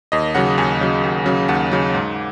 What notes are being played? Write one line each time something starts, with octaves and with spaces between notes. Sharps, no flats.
D#2 D#5
C#3 F#3 F#5
D#2 G#5
C#3 F#3
D#2
C#3 F#3
D#2 F#5
C#3 F#3
G#2